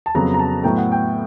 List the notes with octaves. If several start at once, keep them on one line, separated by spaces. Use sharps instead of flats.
A5
F2 C#3 F#3 B3 A#5
A#5
A5
A2 F#3 B3 G5
F#5
G5